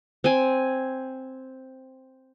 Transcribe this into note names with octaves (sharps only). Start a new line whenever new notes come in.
C4 G#5